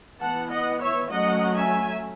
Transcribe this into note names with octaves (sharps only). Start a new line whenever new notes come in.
E3 B3 F#5 A5
D#5 F#5
C#5 E5
F#3 A3 C#4 D#5 F#5
E5 G#5